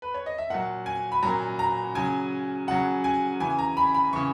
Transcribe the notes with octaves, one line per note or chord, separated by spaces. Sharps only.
B4
C#5
D#5
E5
A#2 F#3 F#5
G#5
B5
A#2 F#3 A#5
A#5
C#3 F#3 G#5
C#3 F#3 F#5
G#5
C#3 E3 G#5
A#5
B5
B5
C#3 E3 C#6